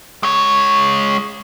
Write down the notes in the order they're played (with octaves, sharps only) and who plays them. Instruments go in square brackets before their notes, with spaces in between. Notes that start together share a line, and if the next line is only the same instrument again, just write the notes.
[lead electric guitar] G#3 C#5